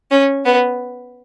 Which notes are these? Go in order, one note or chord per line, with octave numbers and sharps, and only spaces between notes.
C#4
B3